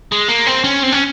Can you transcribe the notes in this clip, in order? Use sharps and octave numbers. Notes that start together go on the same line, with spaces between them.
G#3
A#3
C4
C#4
C4
C#4